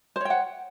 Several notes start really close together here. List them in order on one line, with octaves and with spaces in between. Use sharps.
C5 C#5 G5 F#5